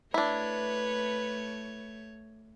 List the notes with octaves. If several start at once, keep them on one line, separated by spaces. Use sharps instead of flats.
A3 D4 E4 B4 C#5